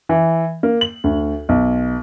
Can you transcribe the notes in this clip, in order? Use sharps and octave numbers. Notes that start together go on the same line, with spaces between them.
E3
A#3
F#7
D2
B1